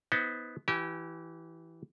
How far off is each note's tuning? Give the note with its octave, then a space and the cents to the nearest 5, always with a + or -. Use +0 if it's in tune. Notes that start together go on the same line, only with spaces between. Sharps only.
B3 +0 D#4 +40 C5 +0
E3 +0 G4 -30 G#5 +5